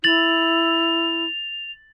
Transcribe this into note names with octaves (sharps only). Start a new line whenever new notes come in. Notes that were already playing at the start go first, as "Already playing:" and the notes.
E4 A6 F7 F#7